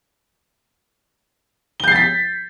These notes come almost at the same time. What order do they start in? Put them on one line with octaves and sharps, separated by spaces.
G7 G6 C7 A6 B6